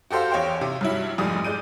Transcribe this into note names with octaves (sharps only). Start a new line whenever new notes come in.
F#4 G4 A4 C5 F5
E2 C#5 F5 G5
C3
G2 F#3 E4
F1 G#2 F3 G3 D#6
G#3 D5 G6 D#7